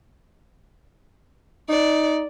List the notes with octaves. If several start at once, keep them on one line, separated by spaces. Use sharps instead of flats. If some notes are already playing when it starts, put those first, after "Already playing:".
D#4 D5